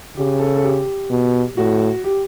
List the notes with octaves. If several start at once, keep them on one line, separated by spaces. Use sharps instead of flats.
C#3 G4
A4
A4
G4
B2
A2 F#4
G4